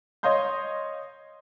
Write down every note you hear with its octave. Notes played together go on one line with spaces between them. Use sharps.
C#5 D#5 F5 C6 G6